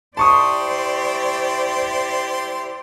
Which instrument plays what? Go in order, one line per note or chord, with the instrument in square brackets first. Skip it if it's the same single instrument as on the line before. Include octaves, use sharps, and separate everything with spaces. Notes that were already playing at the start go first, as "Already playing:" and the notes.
[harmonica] E4 G4 C6 [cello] C5 D5 [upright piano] A5 C#6 D#6